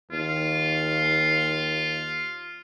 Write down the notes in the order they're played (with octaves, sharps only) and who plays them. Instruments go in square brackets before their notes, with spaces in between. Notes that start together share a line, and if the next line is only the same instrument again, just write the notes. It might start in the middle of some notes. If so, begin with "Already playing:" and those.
[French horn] D#2 [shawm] F4